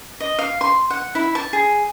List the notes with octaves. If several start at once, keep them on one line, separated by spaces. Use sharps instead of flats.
D#5
F5
C6
F#5
E4
A5
G#4